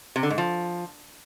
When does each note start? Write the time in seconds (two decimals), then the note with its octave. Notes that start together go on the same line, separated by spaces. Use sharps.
0.16 C3
0.23 D3
0.30 G#2
0.38 F3